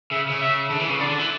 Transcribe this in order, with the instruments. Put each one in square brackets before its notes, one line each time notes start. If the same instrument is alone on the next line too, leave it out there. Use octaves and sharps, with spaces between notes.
[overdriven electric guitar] C#3 [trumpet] E5
[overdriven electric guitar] C#3
[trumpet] E5
[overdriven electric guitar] D3
E3
C#3
[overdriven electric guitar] D3 [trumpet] D5
[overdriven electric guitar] D3
E3